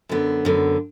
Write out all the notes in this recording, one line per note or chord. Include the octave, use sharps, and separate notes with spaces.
F#2 D3 B3
F#2 D3 B3